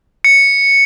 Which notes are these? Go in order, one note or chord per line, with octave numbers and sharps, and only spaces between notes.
C#7